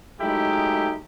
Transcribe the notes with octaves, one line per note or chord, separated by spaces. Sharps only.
F#3 G#3 A3 D#4 E4 G4